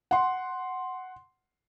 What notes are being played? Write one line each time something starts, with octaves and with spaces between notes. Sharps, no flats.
F#5 C6